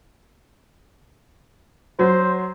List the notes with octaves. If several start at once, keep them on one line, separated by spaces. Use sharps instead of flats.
F#3 C5